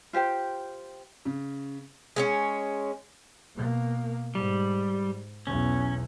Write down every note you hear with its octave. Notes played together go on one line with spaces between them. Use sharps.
F4 G4 C5 G5
C#3
G#3 B3 C#4
B2 A#3
G#2 G3
B1 E2 C#4